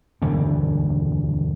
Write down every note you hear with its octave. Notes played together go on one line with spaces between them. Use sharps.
E1 D2 G2